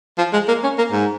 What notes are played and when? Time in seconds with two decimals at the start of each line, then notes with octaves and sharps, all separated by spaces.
0.18 F3
0.33 G#3
0.48 A#3
0.63 C#4
0.78 A#3
0.92 G#2